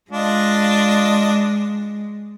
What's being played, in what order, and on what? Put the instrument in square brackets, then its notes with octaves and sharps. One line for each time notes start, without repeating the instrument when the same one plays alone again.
[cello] G#3 [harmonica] D4 F4 D#5